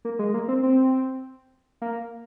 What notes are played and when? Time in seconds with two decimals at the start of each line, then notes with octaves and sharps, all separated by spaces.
0.05 A#3
0.19 G#3
0.29 G#3
0.34 A#3
0.48 C4
0.63 C4
1.82 A#3